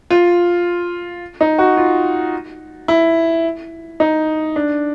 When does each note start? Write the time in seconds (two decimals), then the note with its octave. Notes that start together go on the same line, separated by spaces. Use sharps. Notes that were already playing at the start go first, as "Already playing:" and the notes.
0.10 F4
1.41 D#4
1.58 F#4
1.77 F4
2.88 E4
4.00 D#4
4.56 D4